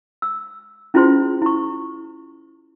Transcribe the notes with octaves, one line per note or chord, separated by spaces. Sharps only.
E6
C#4 E4 F4 G#4 C5 C6
E4 C#6